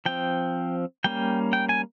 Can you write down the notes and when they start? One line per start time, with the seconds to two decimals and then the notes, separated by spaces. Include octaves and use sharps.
0.06 F3 C4 G5
1.04 G3 A#3 C#4 G5
1.53 G5
1.69 G#5